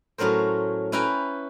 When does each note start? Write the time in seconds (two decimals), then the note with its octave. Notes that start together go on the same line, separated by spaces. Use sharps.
0.18 A2 F#3 C#4 A#4 C5
0.92 C#4 E4 B4 G5 G#5 A#5